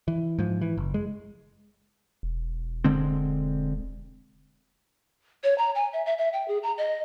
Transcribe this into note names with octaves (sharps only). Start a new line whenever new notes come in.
E3
G#2 F3
E3
F#1
G#3
E1
D3 G#3 C4
C#5
A#5
G#5
E5
E5
E5
G5
G#4
A#5
D#5